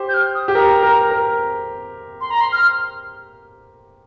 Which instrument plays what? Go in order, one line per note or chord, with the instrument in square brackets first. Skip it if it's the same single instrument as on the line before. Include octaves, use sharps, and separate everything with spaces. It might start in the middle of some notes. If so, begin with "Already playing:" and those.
Already playing: [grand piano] G4 C5
[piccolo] G6
F6
D#6
[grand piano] G4
[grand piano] A#4 [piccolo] A#5
[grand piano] A#4
A#4
[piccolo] C6
A#5
C6
F6